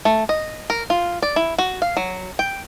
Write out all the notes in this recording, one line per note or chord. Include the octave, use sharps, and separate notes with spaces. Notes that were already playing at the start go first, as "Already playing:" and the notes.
A3
D#5
A#4
F4
D5
E4
F#4
F5
F#3
G5